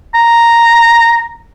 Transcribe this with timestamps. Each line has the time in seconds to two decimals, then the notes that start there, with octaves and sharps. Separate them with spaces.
0.15 A#5